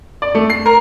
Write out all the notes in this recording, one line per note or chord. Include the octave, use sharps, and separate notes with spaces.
D5
A3
C7
A#4